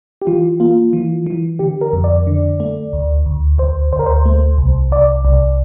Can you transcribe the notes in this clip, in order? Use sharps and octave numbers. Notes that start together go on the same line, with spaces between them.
G4
E3 F4
A#3 F4
E3
E3
D3 G4
A#4
F2
D5
D3
A3
D2
D2
D2 C5
D2 C5
A#4
C5
A3
C2
C2 D5
C2